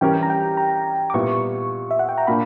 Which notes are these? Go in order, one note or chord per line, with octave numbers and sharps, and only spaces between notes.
E3 G3 C#4 G4 A#4 G5
A#5
G5
A#5
D6
A#2 G3 B3 E4 C#6
E5
F#5
G5
A#5
A#2 A#3 D4 B5